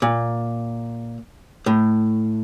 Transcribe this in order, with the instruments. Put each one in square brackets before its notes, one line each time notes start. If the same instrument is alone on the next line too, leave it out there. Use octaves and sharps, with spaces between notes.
[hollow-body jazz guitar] A#2
A2